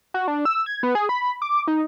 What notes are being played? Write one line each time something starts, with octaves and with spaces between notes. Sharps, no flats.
F#4
D4
E6
G#6
B3
G#4
B5
D6
D#4